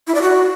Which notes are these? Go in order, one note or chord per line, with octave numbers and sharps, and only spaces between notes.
E4
D5
F#4